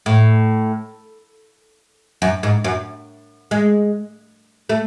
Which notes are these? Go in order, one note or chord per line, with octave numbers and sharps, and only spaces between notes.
A2
F#2
G#2
F#2
G#3
A3